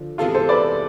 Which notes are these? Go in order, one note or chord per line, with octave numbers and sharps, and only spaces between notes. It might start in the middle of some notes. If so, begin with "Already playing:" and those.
Already playing: D3 F3
C3 E3 G#3 B3 F4 A4
A4 C5
B4 D5